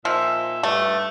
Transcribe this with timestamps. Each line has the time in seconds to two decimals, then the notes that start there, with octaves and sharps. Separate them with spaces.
0.05 A#2 F3 D#4 E5
0.63 G2 A3